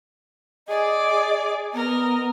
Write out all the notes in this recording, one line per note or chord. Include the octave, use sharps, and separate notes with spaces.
G#4 D5 D#5 D6
B3 A#4 D#5